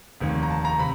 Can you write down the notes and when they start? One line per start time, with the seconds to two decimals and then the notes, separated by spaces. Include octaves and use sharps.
0.20 F1 D#2 D#3
0.43 A#5
0.50 A5
0.65 A#5
0.79 C3 B5